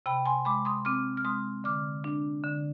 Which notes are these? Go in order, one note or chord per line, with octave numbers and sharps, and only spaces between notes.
C3 G5 B5
G#5 C6
G#3 B5 D6
C6 D#6
C4 D6 F6
F6
G#3 C6 D#6
D3 D6 F6
D4
D3